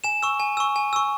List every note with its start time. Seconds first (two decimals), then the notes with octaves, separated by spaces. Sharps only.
0.04 G#5 E7
0.23 C#6 E6
0.40 G#5
0.57 C#6 E6
0.76 G#5
0.93 C#6 E6